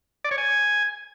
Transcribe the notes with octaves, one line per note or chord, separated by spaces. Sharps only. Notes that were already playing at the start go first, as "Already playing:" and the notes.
D5
C#5
G#5